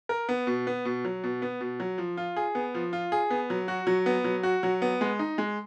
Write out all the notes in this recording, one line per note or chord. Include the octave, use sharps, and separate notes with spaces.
A#4
B3
B2
B3
B2
F#3
B2
B3
B2
F#3
F3
F4
G#4
B3
F3
F4
G#4
B3
F#3
F#4
F#3
B3
F#3
F#4
F#3
B3
G#3
D#4
G#3